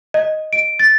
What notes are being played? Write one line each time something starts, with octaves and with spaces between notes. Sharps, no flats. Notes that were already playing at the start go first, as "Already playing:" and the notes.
D#5
D7
A6